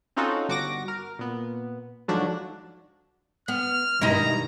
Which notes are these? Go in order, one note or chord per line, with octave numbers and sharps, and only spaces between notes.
C4 C#4 D#4 F4 F#4 A4
G1 F#4 D6 A#6
A#4
A#2 B3
G#2 D3 F3 F#3 D4 F#4
B3 F6
G2 B2 D#3 G#3 D#4 E4 A#5